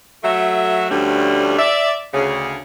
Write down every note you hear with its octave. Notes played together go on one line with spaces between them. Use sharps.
F#3 A3 E5
D2 D3 F3 G3 A3 C#4
D5 E5
D2 C#3 G#4